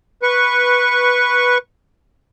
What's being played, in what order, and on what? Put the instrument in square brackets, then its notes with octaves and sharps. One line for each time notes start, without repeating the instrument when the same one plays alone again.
[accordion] B4 C#6